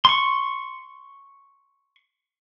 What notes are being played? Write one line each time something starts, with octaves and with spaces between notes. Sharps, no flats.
C6 C#6